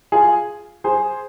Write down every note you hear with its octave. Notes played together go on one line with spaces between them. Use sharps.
F4 G#4
G#4 C5